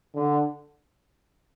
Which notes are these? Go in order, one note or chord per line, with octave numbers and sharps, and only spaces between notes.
D3